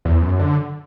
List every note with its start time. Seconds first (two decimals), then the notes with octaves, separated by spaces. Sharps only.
0.05 E2
0.22 F#2
0.39 D3